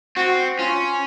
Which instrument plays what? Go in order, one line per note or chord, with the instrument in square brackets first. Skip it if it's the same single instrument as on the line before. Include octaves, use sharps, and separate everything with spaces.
[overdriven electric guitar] C4 [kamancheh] F#4
[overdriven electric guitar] C#4 [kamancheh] F4